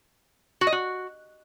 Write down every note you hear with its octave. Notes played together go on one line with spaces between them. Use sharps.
F#4
D#5
F#4